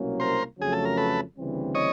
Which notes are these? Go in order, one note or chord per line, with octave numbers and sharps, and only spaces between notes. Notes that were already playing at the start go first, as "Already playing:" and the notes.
Already playing: C2 B2 F#3 A#3 C#4
A#4 C5
F2 C#3 F#3 A3 C#4 G#4
A4
A#4
A4 B4
D2 C#3 E3 G3 C4
C#5 D#5